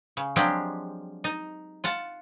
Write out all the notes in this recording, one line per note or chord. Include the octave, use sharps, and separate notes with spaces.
C#3
F3 F#3 G#3 C4 D4 G4
D#4
F4 F#5 A5